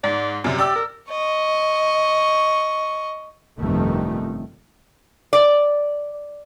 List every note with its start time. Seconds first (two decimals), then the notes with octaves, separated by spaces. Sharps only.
0.04 G#2 D5
0.44 F#2 C3 G3
0.58 G4 D5 D6 E6
0.76 A#4
1.11 D#5 C#6
3.59 G1 F2 C3 D#3 A3
5.33 D5